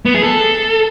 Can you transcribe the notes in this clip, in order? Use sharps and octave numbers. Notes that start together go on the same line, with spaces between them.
B3
G#4
A4